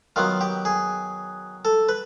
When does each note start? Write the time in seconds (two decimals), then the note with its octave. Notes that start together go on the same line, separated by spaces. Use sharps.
0.16 D#3 F#3 B3 F4
0.41 G4
0.65 G#4
1.65 A4
1.89 B4